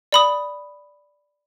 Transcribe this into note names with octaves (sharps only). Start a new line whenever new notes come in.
D5 B5 D#6